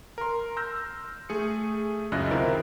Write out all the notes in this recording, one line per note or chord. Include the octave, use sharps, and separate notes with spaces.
A#4 C6
C6 E6 F6 G6 A#6
A3 G#4 C#7
C#2 F#2 C#3 E4 D#5 F#6
C3 D#3 C4 E4 F4 A#4